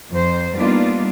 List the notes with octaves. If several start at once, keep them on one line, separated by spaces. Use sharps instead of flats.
F2 C5
G3 A#3 B3 D4 D#4 F4